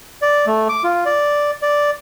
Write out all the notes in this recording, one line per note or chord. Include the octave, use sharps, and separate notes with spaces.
D5
A3
D6
F4
D5
D5